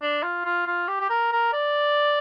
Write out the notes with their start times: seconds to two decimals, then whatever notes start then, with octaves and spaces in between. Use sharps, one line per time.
0.02 D4
0.23 F4
0.45 F4
0.67 F4
0.88 G4
1.00 G4
1.10 A#4
1.32 A#4
1.53 D5